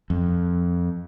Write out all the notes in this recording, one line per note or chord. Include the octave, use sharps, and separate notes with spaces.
F2